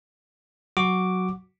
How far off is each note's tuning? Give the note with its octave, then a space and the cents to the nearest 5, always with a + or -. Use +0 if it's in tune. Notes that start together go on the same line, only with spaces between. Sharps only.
F#3 +0 F#4 +0 D6 +0